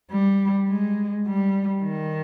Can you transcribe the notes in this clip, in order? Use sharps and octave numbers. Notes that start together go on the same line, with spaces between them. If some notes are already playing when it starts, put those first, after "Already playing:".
G3
G#3
G3
D#3